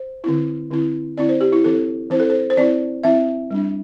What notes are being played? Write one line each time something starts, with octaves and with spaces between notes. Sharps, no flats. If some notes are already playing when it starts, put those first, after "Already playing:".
Already playing: C5
D3 C4 E4
D3 C4 E4
D3 C4 E4 D5
C5
G4
E4
E3 C4 E4 A4
E3 C4 E4 C5
A4
C5
C5
E3 C4 E4 D5
E3 C4 E4 E5
G3 D4